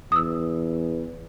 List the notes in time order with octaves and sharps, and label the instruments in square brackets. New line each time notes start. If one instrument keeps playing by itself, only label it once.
[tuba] E2 [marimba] D#6 E6